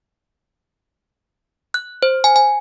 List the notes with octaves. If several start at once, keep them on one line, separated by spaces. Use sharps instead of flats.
F#6
C5
G#5
G#5